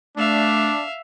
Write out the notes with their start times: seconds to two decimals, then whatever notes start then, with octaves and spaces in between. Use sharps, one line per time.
0.17 A3 D4 E5 F5